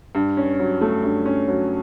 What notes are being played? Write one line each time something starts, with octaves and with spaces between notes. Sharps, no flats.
G2
C#4
F#3
A3
G2
C#4
F#3